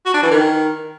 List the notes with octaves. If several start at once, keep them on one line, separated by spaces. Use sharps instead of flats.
F#4
D4
E3
D#3